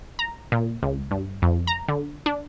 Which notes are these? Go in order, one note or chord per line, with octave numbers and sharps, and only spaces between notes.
A#5
A#2
C#2
G2
F2
A#5
D3
D4